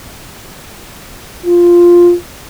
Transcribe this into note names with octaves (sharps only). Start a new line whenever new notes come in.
F4